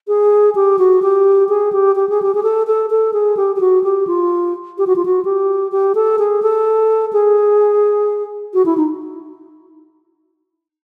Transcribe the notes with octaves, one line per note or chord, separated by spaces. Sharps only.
G#4
G4
F#4
G4
G#4
G4
G4
G#4
G4
G#4
A4
A4
A4
G#4
G4
G4
F#4
G4
F4
G4
F#4
F4
F#4
G4
G4
A4
G#4
A4
G#4
F#4
E4
D#4